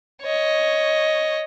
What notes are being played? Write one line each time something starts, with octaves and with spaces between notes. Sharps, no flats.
C#5 D#5